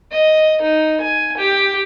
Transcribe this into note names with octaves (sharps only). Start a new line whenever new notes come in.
D#5
D#4
G#5
G4